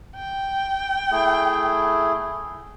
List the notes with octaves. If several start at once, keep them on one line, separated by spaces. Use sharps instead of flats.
G5
A3 E4 G#4